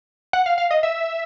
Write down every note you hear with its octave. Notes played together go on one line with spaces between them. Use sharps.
F#5
F5
F5
D#5
E5